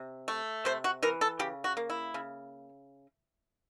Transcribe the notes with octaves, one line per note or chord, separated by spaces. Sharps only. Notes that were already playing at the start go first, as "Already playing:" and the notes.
Already playing: C3
A3
C3 C5
F#4
E3 A#4
A4
C#3 G4
F#4
A#3
E4
C#3